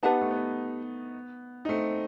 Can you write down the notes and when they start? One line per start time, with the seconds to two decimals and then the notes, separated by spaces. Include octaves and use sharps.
0.03 B3 D#4 G4 B4 F#5 A5
0.21 A3
0.31 B3
1.65 D#4
1.69 A3 C4